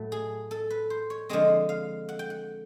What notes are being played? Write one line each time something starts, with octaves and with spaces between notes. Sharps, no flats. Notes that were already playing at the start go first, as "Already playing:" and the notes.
Already playing: A2 F#3 A3
G#4
A4
B4
C5
C#5
D3 F3 G#3 C4 D#5
F5
F#5
G5
F#5